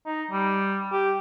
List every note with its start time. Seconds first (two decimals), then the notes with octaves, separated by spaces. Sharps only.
0.06 D#4
0.31 G3
0.92 G4